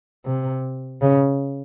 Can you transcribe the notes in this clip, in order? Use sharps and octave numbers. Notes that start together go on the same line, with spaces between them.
C3
C#3